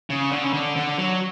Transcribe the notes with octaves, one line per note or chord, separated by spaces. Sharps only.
C#3
D3
C#3
D3
D3
F#3